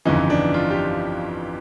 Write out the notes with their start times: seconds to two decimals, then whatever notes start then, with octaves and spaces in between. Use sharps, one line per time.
0.05 G1 F2 C#3 E3 D#4
0.30 D4
0.54 F4
0.70 G4